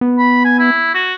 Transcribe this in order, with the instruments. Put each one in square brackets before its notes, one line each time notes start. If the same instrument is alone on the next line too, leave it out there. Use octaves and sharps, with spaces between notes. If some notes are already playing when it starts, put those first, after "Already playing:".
[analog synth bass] B3
[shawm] B5
G#5
E4
F#4